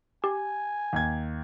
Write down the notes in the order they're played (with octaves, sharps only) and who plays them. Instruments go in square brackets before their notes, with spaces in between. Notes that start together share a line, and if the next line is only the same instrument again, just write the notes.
[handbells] G4 [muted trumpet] G#5
[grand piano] D#2 G#6